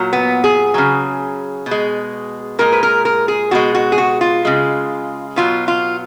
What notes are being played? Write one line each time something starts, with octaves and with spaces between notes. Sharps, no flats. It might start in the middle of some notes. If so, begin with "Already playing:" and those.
Already playing: A#2 F#3
B3
G#4
C#3 F#3
B2
G#3
A#2 G#3 A#4
B4
A#4
A#4
G#4
B2 G#3 F#4
F#4
G#4
F#4
F4
C#3 G#3
B2 F#3 F4
F4